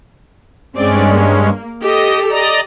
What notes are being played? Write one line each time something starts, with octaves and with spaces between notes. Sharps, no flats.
G2 G#3 C4 C#4 G#4 D5
A#3
G4 A4 D#5
D5 D#5 A#5